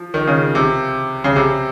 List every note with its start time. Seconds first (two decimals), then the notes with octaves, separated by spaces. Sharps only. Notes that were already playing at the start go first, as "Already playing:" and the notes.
Already playing: F3
0.14 D#3
0.27 C#3
0.55 C3
1.24 C#3
1.36 C3